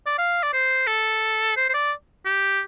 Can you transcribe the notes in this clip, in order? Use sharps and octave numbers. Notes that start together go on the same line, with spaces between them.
D5
F5
D5
C5
A4
C5
C5
D5
G4